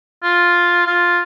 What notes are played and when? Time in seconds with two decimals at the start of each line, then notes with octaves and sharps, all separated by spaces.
0.23 F4
0.86 F4